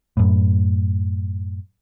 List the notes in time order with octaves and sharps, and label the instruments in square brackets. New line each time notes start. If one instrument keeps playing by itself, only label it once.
[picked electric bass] F#2 A2